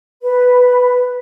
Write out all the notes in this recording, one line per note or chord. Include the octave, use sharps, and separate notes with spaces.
B4